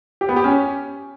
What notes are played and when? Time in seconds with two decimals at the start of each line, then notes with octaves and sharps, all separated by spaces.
0.21 G4
0.29 B3
0.36 G4
0.44 C#4